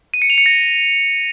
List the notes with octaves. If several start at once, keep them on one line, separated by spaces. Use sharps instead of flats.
D#7
C#7
F7
C#7
A#6